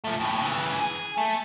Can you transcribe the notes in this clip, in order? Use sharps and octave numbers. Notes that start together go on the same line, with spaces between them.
F3 A3
D#2 A2
C#3 E3
G#4
A3